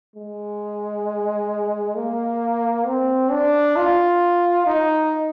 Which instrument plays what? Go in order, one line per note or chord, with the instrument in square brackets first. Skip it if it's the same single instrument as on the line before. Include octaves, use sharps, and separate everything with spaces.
[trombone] G#3
A#3
C4
D4
F4
D#4